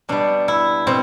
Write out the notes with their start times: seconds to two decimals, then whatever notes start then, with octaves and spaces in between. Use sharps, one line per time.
0.09 B2 G3 D4
0.48 E4
0.87 B2 C4